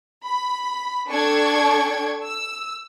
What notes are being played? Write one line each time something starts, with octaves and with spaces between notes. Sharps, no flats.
B5
D4 A4 G5 C#6 G#6
E6